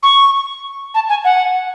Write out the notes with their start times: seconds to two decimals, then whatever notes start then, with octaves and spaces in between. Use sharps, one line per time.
0.03 C#6
0.95 A5
1.09 G#5
1.24 F#5